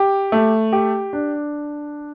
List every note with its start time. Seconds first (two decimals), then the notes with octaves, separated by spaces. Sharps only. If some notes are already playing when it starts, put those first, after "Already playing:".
Already playing: G4
0.32 A3
0.72 G4
1.13 D4